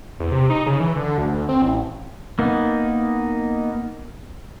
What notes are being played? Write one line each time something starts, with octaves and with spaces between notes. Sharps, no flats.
E2
C3
D#4
C#3
E3
D3
D2
D2
C4
A1
A#3 B3 D#4